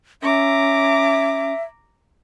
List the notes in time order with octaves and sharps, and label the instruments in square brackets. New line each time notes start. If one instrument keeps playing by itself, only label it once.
[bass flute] C#4 [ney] E5 [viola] A#5 D6